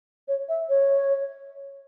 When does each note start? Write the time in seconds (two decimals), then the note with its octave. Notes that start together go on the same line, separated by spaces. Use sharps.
0.28 C#5
0.49 E5
0.69 C#5